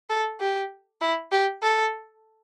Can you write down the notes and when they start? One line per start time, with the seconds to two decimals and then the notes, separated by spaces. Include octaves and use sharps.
0.09 A4
0.40 G4
1.01 E4
1.32 G4
1.62 A4